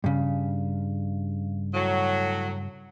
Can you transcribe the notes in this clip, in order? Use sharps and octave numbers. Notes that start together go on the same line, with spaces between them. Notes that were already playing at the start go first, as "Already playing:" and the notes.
G2 C#3
A2 F#3